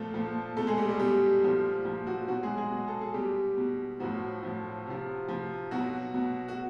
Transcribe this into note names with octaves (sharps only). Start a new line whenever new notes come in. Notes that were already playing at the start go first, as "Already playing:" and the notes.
Already playing: A#2 F3 A3 A4
A#2 F3
B2 A3 A4
G#3 G#4
G3 G4
G3 G4
B2 G3 G4
A#2 F3
A#2 F3
F#3 F#4
B2 F#3 F#4
G#3 G#4
G#3 G#4
B2
A4
G#4
B2 G3 G4
B2
A2 F3 F#3 F#4
A2 F3
C3 F3
C3 F3
B2 F#3 F#4
B2
F#4